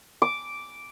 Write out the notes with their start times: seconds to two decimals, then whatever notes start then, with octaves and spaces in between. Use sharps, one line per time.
0.22 D6